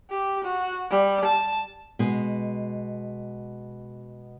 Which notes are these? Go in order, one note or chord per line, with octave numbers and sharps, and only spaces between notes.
G4
F#4
G3
A5
B2 G#3